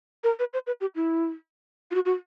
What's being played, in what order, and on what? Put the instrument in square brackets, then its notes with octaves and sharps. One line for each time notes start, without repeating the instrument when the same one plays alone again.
[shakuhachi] A#4
B4
C5
B4
G4
E4
F4
F#4
F#4